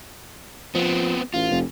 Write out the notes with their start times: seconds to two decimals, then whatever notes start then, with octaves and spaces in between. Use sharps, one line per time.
0.75 F3 B3 C4
1.34 A1 F4
1.51 F1